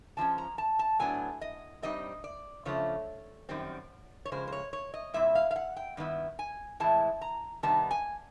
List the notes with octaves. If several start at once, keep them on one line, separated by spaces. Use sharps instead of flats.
C3 F3 G#3 C#4 A5
A#5
A5
A5
A2 F#3 B3 D4 G#5
D#5
G2 E3 G3 C4 D#4 D#5
D5
C#3 F3 A3 D4 C#5
F#2 D#3 G3 C4
C#5
C#3 F3 G#3 C5
C5
C#5
C#5
D#5
A#2 G3 C4 E4 E5
F5
F5
F#5
G5
G2 D#3 B3 E4
G#5
A2 E3 G#3 C4 E4 A5
A#5
C3 D#3 G3 B3 D#4 A5
G#5